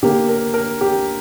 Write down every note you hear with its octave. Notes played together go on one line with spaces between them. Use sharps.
D3 A#3 G4
A#4
A#4
G4